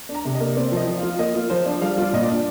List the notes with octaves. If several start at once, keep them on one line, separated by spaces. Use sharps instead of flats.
D4
A#5
C3
D#5
A#3
C4 D5
F3 D#5
F3
F5
F4
A#3 D#5
F4
F3 C5
D4
G3 F5
F4 D5
A#2 D#5
D5
D4